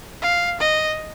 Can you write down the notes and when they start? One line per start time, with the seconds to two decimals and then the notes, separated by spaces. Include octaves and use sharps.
0.22 F5
0.60 D#5